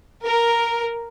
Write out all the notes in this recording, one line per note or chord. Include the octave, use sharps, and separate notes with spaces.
A#4